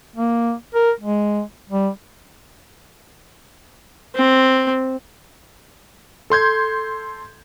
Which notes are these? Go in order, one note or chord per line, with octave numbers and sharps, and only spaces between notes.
A#3
A#4
G#3
G3
C4
A4 C6 G6 G#6